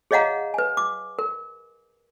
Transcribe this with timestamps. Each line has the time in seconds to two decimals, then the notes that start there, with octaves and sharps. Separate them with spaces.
0.11 G#4 C#5 D#5 F5 F#5 A#5
0.54 B4 G#5
0.77 D6
1.19 A#4